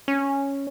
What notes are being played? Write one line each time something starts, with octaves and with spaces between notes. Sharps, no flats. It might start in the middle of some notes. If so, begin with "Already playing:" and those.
C#4